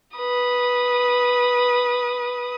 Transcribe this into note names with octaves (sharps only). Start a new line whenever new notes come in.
B4 D#6